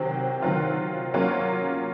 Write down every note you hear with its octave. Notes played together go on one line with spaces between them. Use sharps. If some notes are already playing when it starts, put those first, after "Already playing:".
Already playing: C3 D#3 F#3 C4
D#3 F#3 C4 F4
F#3 A#3 C#4 F4